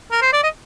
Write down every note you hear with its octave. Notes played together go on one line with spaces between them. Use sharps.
A#4
C5
D5
D#5